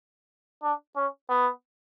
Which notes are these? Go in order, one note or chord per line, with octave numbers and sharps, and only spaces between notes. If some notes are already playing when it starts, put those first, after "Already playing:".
D4
C#4
B3